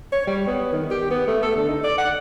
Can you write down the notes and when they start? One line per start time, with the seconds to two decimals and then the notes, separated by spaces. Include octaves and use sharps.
0.12 C#5
0.27 G3
0.47 B3
0.72 D#3
0.91 G4
1.11 B3
1.27 A3
1.43 A4
1.56 D3
1.68 D#4
1.84 D5
1.98 F#5